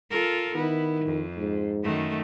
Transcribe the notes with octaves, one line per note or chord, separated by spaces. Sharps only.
F4 A4 A#4
D#3 B3 E4
F2
G#2
F#2 D#3 A3